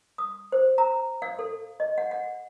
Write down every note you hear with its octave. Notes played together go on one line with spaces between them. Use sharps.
D#6
C5
A#5
F5
A4
D#5
F#5
F#5